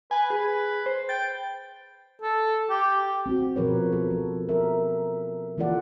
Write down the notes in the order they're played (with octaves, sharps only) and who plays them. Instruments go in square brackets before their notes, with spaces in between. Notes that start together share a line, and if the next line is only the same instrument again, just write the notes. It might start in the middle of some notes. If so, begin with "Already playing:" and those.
[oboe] B4 [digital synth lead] G#5
[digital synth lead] G#4 [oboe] B4
[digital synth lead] C5
[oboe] G5 [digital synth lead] A6
[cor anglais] A4
G4
[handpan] C4 F#4
B2 F3 A#4 B4 C#5
A4
F3
A#4 E5
E3 A#3 F4 A4 D5 F#5